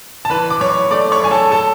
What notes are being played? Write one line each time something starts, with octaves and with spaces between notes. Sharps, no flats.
A5
E3 B4 B5
D6
F#2 C#5 C#6
A3 D5 D6
C#5 C#6
F#2 G#5
A4 A5
A4 A5